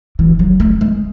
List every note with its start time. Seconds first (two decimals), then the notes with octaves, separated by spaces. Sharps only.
0.19 E3
0.39 F#3
0.60 A3
0.81 G#3